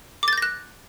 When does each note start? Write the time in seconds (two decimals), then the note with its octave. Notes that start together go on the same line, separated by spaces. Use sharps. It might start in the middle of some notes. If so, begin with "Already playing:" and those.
0.23 D6
0.28 A6
0.33 G6
0.38 A#6
0.42 F#6